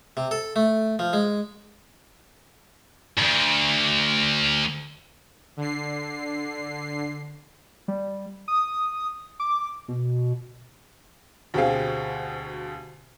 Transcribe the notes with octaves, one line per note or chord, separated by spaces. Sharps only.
C3
A4
A3
F3
G#3
D2 G2
D3 C7
G3
D#6
D6
B2
D2 B2 C4 G4 G#4 F5